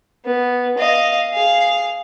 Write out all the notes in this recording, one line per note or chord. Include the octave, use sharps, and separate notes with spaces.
B3
D#5 F5
G#4 F5